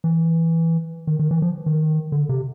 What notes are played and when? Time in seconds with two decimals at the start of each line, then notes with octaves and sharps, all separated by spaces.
0.04 E3
1.07 D#3
1.19 D#3
1.31 E3
1.42 F3
1.66 D#3
2.12 D3
2.29 C3